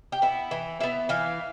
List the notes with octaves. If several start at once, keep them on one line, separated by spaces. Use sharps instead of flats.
G4
B3 E4
E3
B3 E4 E5
E3 F5